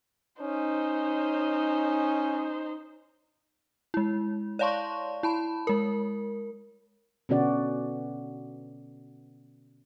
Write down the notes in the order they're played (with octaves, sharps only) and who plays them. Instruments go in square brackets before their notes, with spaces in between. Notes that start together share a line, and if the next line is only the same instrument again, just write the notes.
[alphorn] C#4 [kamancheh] D#4 C5
[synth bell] G#3 E4
C#5 D5 F5 A5 C6 C#6
E4 A5 B5
G#3 A#4
[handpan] B2 D3 B3 C#4 F#4 D5